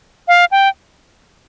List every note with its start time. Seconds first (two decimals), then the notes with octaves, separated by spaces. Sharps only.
0.28 F5
0.51 G5